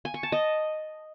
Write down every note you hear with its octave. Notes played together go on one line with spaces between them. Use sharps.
G#5
C#6
A5
D#5